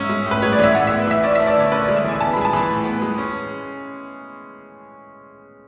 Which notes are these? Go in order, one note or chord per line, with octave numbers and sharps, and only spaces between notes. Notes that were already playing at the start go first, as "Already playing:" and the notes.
Already playing: G#2 C#4 E5
G#3
A2 B4
G#3 C#5
D5
E3 E5
A2 F#5
E5
B3
E3 E5
C#4 D5
E5
A3
D5
D3 C#5
C#4 B4
D5
G#3
E5
E3 G#5
G#5
B3 A5
B5
G#3 G#5
A5
E3 B5
A2
B3
G#3
C#4